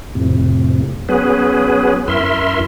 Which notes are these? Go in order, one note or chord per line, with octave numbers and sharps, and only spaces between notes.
F2 A2 C3
F#3 B3 C#4 G#4 B4
F#2 E4 A#4 E5 C6